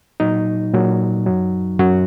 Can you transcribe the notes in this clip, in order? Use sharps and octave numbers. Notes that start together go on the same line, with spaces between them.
A#2 F#3 D#4
A#2 F#3
F#2 F#3
F#2 F#3 F#4